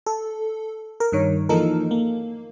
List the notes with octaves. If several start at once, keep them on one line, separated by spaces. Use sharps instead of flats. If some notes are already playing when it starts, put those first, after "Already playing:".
A4
A#4
G2 D#3 C#5
E3 F3 A#3 D#4 A4 A#4
A#3